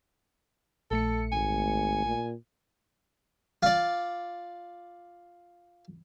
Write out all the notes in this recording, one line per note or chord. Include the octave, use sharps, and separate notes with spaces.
A#1 A3 A4 C#7
G#1 G#5
A#2
F4 D5